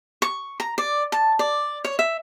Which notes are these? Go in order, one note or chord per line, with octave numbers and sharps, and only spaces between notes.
C#6
A#5
D5
A5
D5
C#5
E5